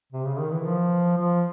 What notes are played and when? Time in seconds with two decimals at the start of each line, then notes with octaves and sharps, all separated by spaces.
0.13 C3
0.26 C#3
0.39 D#3
0.52 E3
0.66 F3
1.18 F3